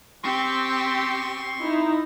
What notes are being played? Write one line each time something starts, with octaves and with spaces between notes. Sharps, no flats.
C4 G4 C6 C#6
D#4 E4